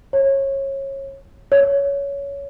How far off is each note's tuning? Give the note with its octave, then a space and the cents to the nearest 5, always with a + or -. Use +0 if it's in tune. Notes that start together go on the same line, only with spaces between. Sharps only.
C#5 -25
C#5 +15